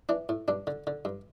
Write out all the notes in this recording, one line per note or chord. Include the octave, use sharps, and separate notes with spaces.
E3 D4
A2
G2 D4
D3
D3
G2